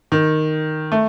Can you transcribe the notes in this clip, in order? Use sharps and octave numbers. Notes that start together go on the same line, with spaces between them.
D#3
A3